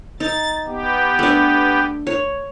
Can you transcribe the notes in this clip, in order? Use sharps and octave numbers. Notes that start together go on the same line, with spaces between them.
D#4 A6
B3 G4
A3 D4
C#5